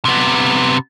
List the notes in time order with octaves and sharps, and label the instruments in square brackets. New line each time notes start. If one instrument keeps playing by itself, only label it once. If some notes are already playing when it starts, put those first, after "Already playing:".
[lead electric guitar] C3 B3